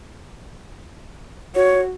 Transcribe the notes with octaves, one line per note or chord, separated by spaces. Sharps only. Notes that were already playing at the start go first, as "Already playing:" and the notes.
F#4 C#5